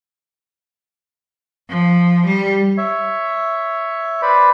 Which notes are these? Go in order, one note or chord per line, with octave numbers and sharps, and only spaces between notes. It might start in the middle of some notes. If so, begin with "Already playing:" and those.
F3
G3
C#5 E5
B4 C5 D5 B5